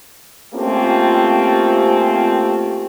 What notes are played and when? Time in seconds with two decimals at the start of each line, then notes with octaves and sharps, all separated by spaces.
0.54 A3 A#3 C4 C#4 F4 G4